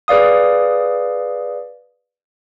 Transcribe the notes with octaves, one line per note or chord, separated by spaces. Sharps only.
G#4 B4 D5 F5 D#6